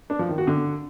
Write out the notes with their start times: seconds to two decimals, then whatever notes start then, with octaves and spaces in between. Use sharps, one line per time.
0.10 D4
0.19 F3
0.29 D#3
0.38 F#4
0.47 D3